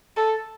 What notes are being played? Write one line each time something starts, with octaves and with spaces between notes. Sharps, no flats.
A4